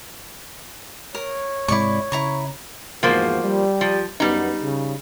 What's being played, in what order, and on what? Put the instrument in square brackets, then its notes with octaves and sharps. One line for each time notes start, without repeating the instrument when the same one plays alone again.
[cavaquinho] A#4 [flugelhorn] C#5
[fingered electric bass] G#2 C3 G#3 [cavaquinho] E4 D5 C#6
[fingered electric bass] C#3 [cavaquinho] E4 A#5 C#6
[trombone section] E2 G#2 F#4 [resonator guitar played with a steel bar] F3 A#3 C5
[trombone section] G3
[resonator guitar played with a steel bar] F3
[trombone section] F#2 B3 [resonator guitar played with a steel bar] G3 D#4
[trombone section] C#3